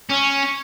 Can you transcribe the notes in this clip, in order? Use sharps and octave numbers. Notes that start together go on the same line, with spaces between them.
C#4